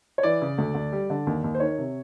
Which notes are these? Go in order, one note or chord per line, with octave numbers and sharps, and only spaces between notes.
C#5
E3 D5
C#3
D2
D2
G3
D3
D#2
D#2
C5
D#3 C#5
C3